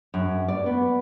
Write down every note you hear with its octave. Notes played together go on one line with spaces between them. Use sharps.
F#2
D5
B3